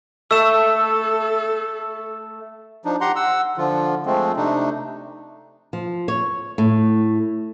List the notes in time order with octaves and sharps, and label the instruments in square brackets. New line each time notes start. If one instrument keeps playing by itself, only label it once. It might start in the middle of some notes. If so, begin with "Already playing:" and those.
[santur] A3 [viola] A4 [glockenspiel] E6 E7
[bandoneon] F3 D4 D#4
G4 F#5 A#5 C6
F#5 E6
D3 F3 F4
F3 G#3 A3 C4
C3 A3 D4 D#4
[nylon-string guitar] F3
C#5
A2